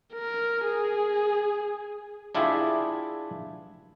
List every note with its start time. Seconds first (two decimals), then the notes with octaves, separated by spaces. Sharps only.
0.14 A#4
0.65 G#4
2.35 D4 E4 F4 G4 G#4 E5